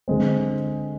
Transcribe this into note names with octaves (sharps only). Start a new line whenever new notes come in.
D3 G#3 C4